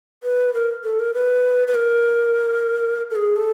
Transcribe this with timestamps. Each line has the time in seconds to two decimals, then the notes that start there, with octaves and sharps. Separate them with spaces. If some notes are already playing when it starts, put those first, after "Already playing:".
0.23 B4
0.54 A#4
0.84 A4
0.99 A#4
1.14 B4
1.68 B4
1.75 A#4
3.11 A4
3.16 G#4
3.36 A4